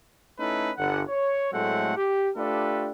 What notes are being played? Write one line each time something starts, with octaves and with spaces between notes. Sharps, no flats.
A3 C#4 D#4 E4 A4 B4
G1 D3 F#5
C#5
A2 F#3 G#3 A3 C4 F#5
G4
A3 D4 F4 G4 A4 B4